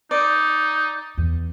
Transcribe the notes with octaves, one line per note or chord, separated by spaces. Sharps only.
D#4 D5
E2